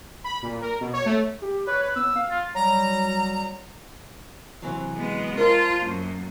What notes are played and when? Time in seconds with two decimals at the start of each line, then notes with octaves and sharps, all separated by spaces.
0.24 B5
0.42 A#2
0.61 A#4
0.80 B2
0.93 C#5
1.06 A3
1.42 G4
1.67 B4 C#5
1.83 B4
1.96 B3 E6
2.16 F5
2.31 F4
2.55 F#3 G3 A#5
4.62 C3 E3 F#3
4.95 G#3 B3
5.37 F4 A#4 C5 A5
5.84 F#2 A#3